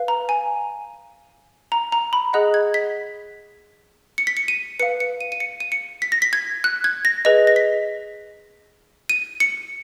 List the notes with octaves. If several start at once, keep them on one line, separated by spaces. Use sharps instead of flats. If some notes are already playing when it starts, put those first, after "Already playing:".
Already playing: B4 F5
A#5
G#5
A#5
A#5
B5
G#4 D#5 F#5 F#6
G#6
B6
C#7
B6
C#7
D#7
B4 F5 C#7
C#7
D#7
D#7
C#7
D#7
C#7
B6
A#6
B6
G#6
F#6
G#6
A#6
G#4 B4 D#5 A#6
A#6
B6
D#7
C#7